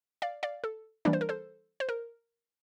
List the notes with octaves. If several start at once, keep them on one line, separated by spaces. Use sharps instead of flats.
D5 F5
D5 F5
A4
E3 G3 A#3 D4 D5
C5
A#4
A4 C5
C5
A#4